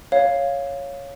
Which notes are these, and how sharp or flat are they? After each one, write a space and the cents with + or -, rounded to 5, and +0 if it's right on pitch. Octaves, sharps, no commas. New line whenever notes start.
C#5 +0 F5 +0